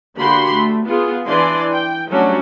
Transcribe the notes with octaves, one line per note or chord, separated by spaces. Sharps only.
D3 A#3 F#4 G4 B5 C6
A3
B3 F4 G#4
E3 D4 D5 G#5 C6
G5
F#3 G3 A3 C#4 D4 F#4